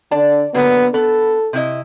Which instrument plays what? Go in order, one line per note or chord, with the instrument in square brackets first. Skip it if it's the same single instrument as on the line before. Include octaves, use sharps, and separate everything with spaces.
[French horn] D3 [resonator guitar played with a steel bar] D5 A5
[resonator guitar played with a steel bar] D3 F#3 A#3 [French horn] B3
[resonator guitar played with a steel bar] B3 [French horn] A4
[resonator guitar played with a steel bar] C3 E4 D#5